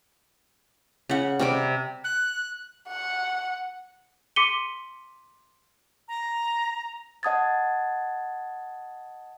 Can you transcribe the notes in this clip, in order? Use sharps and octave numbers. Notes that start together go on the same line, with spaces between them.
C#3 F#5
C3 G3 D6
F#6
F#5
C6 D6 B6 C#7 D#7 G7
A#5
D#5 F#5 A5 D#6 G#6 A6